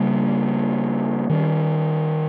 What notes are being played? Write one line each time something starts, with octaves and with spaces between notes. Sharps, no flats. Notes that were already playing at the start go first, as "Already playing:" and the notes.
Already playing: C#3 G3 A#3
D#3 G3 A#3 C#4